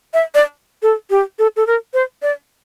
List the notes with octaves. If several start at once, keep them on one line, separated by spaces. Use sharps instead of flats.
E5
D5
A4
G4
A4
A4
A#4
C5
D5